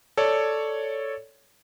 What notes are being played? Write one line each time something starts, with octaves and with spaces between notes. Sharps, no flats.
A4 C#5 D5